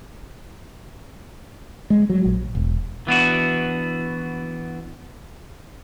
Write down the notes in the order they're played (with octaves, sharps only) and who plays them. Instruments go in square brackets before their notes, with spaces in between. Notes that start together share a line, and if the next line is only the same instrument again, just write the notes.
[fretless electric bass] G#3
F#3
A#1
E1
[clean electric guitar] E3 B3 D4 F#4